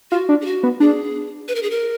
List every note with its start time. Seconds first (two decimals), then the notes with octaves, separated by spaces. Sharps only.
0.11 F4 F#4
0.29 D4
0.41 G#4
0.45 F#4
0.63 B3
0.80 D4 G#4
1.48 B4
1.55 A#4
1.63 G#4
1.70 A#4